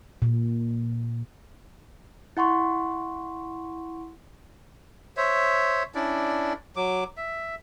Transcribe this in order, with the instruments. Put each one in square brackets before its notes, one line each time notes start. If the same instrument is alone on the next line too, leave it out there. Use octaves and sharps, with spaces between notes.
[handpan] A#2
[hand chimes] E4 F#5 C6 C#6
[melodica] C5 C#5 E5
C#4 D4 E4 D5
F#3 D6
E5